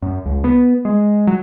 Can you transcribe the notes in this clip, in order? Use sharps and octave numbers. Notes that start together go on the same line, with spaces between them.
F#2
C#2
B3
G#3
F#3